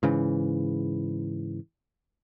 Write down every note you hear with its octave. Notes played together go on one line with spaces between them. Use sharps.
G#2 C#3 E3